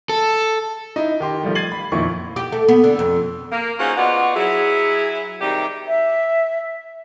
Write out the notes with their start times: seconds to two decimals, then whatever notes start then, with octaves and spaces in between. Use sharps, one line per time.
0.09 A4
0.96 D#4 E4
1.20 D#3 G4 C6
1.43 D#3 F3 G3 A3
1.55 G#6 A6 C7 D#7 F#7
1.72 B5
1.92 F2 A#2 D#3 E4 C#6
2.36 G4
2.52 A3
2.68 B3
2.84 D3
2.99 F2
3.52 A#3
3.79 C#4 D#4 F4 F#4 G#4 C5
3.97 B3 F4 F#4 D5 D#5 F#5
4.36 F#3 E4 G#4
5.41 C3 D#3 G3 G4
5.87 E5